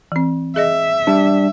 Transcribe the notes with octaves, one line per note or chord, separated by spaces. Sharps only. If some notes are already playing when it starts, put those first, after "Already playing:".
E3 C4
G#4 D#5 E5 A#6
G3 D4